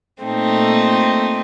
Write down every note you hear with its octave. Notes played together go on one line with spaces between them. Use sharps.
A#2 A3 C4 D#4